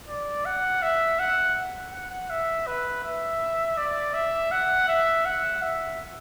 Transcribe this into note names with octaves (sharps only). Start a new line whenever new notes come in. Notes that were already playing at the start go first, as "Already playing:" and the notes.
D5
F#5
E5
F#5
F#5
E5
B4
E5
D5
E5
F#5
E5
F#5
E5